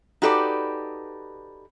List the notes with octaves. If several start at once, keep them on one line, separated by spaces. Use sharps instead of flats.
D#4 F#4 G4 A4 B4 D5